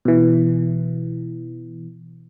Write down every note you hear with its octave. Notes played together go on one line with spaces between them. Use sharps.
B2 E3